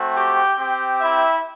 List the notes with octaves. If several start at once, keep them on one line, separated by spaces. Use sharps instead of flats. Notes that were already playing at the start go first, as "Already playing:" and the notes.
Already playing: A3 C4 F#4
G4 G5
C4 G4
E4 E5